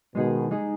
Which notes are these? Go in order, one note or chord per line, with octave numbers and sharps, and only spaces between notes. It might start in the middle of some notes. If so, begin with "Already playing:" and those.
B2 D#3 G#3 D#4 G#4
G#3 D#4 G#4